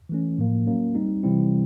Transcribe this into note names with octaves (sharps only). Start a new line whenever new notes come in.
E3 A3 C#4
A2 F3 A#3
F#3 A#3 C#4
G3 C4 D#4
C3 E3 G3 C4 E4